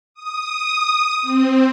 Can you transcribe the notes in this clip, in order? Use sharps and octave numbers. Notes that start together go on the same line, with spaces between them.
D#6
C4